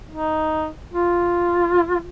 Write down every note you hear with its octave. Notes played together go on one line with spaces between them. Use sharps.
D#4
F4